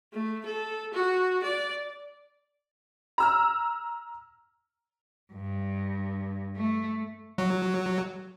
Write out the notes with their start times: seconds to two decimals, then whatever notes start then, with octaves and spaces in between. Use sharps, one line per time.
0.13 A3
0.45 A4
0.93 F#4
1.44 D5
3.18 A#5 E6 F6
5.33 G2
6.56 A3
7.38 F#3